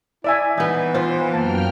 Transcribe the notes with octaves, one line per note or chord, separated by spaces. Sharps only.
E4 D5 E5 G#5
E3 B3 D#4
F4 C5
F#2 A#3 G5 A5 F6